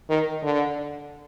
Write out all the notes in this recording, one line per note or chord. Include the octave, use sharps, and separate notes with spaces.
D#3
D3